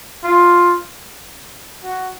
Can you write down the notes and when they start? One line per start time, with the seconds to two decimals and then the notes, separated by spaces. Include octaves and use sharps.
0.23 F4
1.83 F#4